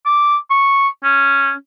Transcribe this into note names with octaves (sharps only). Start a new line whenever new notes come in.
D6
C#6
C#4